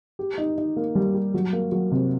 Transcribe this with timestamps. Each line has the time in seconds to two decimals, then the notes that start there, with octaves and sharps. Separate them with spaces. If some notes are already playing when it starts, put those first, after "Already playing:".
0.19 G4
0.38 D#4
0.58 D#4
0.76 A#3
0.95 G3
1.14 G4
1.34 F#3
1.53 A#3
1.72 F#3
1.91 C3